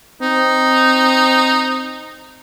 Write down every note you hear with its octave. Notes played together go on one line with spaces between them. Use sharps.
C4 D#4